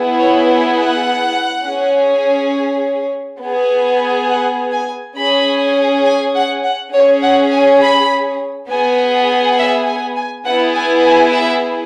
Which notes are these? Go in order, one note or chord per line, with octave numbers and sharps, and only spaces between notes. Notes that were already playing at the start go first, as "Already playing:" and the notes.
Already playing: B3 E4 G#4
C#5
F#5
C#4 G#4
B3 G#4
F#5
G#5
C#4 G#4 B5
G#5
F#5
F#5
C#4 G#4 C#5
F#5
G#5
B5
B3 G#4 G#5
E5
G#5
G#5
B3 E4 G#4 F#5
G#5
G#5
E5